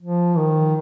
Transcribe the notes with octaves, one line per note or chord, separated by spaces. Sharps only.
F3
D#3